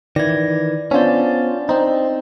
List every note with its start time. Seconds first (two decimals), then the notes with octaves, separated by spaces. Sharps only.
0.16 D#3 E3 D5 G#6 A#6
0.91 B3 C#4 D4 F4 C5 D5
1.69 C4 D#4 C5